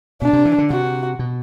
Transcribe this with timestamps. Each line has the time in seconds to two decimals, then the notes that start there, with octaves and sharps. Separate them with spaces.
0.22 B2 D4
0.33 C3
0.45 E3
0.58 D3
0.70 C3 F#4
1.19 B2